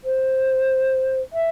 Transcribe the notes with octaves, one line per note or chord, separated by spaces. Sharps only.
C5
E5